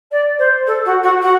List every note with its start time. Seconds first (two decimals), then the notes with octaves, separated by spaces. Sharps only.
0.11 D5
0.38 C5
0.66 A4
0.85 F#4
1.03 F#4
1.22 F#4